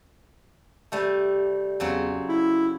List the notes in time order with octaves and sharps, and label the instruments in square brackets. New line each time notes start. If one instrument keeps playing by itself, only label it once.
[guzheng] C3 G3 A3
[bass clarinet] E2 [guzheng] C#3 F#3 C4
[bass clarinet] E4